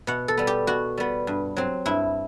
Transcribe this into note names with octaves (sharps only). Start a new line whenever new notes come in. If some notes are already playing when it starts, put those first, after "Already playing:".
B2 F#5
A4
G3 B3
G4
B2 F#4
G3 B3
G2
F#3 C4
G2 E4